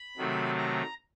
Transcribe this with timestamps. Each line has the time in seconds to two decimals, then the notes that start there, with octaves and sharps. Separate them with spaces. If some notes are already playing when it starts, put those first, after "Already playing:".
Already playing: B5
0.17 C3 D#3 F#3 A3
0.58 A#5